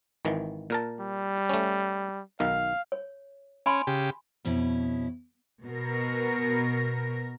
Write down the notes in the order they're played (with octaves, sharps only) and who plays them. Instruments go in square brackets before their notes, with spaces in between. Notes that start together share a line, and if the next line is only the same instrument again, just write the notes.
[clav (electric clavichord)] G#1 D#3 E3
A#2 A#4 A5
[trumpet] G3
[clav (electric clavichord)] A3 C#4
[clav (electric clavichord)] B1 D#3 [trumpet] F5
[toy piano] C#5
[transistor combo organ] C#4 [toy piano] G#5 B5 C6
[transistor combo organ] C#3 G4
[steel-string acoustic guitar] F2 B2 C#4 E4
[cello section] B2 A#4